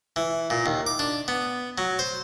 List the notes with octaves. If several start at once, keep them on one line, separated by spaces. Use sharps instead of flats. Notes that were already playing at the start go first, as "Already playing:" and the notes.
E3
A#2
D#2
D6
D4
B3
F#3
C5